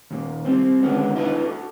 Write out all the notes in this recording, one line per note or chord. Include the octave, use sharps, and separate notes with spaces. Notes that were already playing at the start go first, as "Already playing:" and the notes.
D#2 A#2
G3 C4 C5
D3 D#3 G#3 B3 C#4 F#4
D4 E4 F#4 B4 D#5 E5
F#4 A4